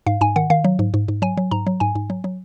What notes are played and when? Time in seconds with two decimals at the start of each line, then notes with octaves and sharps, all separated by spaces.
0.06 G#2 F5
0.21 G#2 G#5
0.36 D#3 F#5
0.50 D#3 F5
0.64 F#3
0.79 G#2
0.94 G#2
1.08 G#2
1.22 F#3 G#5
1.37 F#3
1.51 G#2 A#5
1.67 F#3
1.80 G#2 G#5
1.95 G#2
2.10 F#3
2.24 F#3